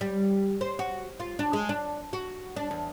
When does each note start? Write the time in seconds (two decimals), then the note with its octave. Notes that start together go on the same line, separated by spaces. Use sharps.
0.01 G3
0.61 C5
0.79 F#4
1.20 F4
1.39 D4
1.53 G#3
1.69 D4
2.13 F#4
2.56 D4
2.71 E2